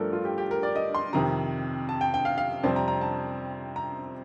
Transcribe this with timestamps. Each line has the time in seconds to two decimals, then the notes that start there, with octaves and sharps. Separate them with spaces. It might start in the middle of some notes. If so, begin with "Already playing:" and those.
Already playing: G2 F3 A3 D4 A4 A#4
0.13 F4
0.25 G4
0.38 G4
0.51 A#4
0.63 D5
0.76 D#5
0.95 C6
1.13 F2 C3 D#3 A#5
1.89 A5
2.01 G5
2.14 G5
2.25 F5
2.38 F5
2.63 F2 C3 G3 C4 A5
2.76 A#5
2.88 A#5
3.01 A5
3.76 A#5